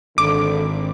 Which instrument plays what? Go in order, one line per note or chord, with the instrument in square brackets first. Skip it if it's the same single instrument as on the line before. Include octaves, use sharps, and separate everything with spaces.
[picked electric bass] G#1 [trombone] D3 [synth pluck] D6